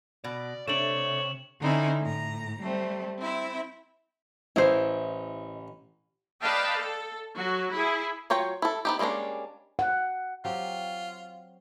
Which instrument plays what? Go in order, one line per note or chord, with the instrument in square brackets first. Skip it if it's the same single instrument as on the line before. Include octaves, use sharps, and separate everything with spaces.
[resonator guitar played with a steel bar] B2 [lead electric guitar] D5
[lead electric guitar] C3 [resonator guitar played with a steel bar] A3 D4 [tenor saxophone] C#5 [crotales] E7 F#7
[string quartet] D3 C4 C#4 D#4 E4
A2 A#5
G3 A3 C4
C4 E4 E5
[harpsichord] A1 [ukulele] E4 C5 [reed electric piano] D#5 E6
[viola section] B4 D5 D#5 F5 G5 A5
A4
F#3 F#4
E4 G#4
[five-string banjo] F#3 F4 C#5 G5
E4 A4
B3 D#4 G4
G3 G#3 A#3 C#4 D4
[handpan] F#5
[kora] F#3 C4 G4 [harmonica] F4